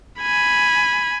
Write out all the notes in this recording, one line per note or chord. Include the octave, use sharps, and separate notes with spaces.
G#5 B5